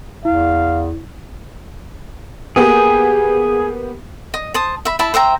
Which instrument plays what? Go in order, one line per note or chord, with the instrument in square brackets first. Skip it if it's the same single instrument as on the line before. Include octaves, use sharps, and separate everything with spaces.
[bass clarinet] E2 [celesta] E4 [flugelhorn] F5
[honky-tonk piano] A#3 B3 G4 [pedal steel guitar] G#4
[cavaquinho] D#5
C5 A5 D#6
E5 B5
E4 E5 A5 B5
C5 E5 G5 A#5